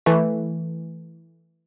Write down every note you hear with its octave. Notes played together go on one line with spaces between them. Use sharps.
E3 A3